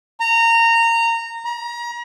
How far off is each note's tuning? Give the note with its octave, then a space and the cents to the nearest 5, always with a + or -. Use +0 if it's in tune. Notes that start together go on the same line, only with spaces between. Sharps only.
A#5 -20
A#5 +35